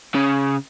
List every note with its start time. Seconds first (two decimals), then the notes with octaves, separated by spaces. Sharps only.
0.14 C#3